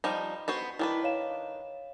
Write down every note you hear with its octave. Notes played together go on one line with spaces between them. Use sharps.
F3 G3 D#4
B3 F#4 C5
D#3 D4 E4 B4
C#5 F5 E7